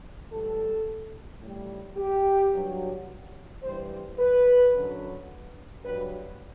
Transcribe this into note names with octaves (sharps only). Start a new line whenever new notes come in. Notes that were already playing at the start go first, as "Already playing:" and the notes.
A2 E3 G3 A4
A2 G3
G4
G2 F#3
G2 E3 G3 C5
B4
F#2 D3 F#3
G2 F#3 B4